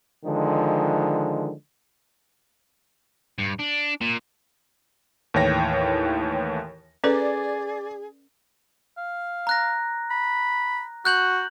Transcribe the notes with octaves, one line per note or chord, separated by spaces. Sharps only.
D3 D#3 F3 G#3
G2
D4
A#2
D#2 A2 E3 C#5 G5 A#6
C#4 G#4 A4 B4 D5
F5
A#5 F#6 A#6
B5
F#4 F#6 G6 F#7